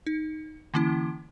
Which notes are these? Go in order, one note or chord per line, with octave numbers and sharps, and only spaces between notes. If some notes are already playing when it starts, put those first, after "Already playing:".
D#4
D3 E3 A#3 C#4 E4